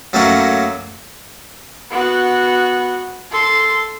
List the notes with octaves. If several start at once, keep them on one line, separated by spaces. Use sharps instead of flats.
F#2 F#3 A3 A#3 C#4 F#4
B3 F#4
A4 C6